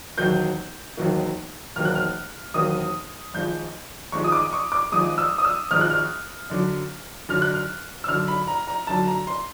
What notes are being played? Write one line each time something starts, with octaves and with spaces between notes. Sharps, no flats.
E1 D#2 D#3 F#3 A#3 G6
E1 D#2 D#3 F#3 A#3
E1 D#2 D#3 F#3 A#3 F6
F#6
F6
E1 D#2 D#3 F#3 A#3 D#6
G#1 G#2 F3 G#3 G6
G#1 G#2 F3 G#3 C#6
D#6
D6
C#6
D6
G#1 G#2 F3 G#3 D#6
E6
D#6
E6
G#1 G#2 F3 G#3 F6
F#6
F6
F#2 D3 F#3
F#2 D3 F#3 F6
F#6
F6
E6
F#2 D3 F#3 F6
B5
A#5
A#5
F#2 D3 F#3 A5
A#5
C6